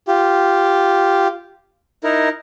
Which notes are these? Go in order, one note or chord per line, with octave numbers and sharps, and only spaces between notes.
F4 G4
D#4 E4 A#4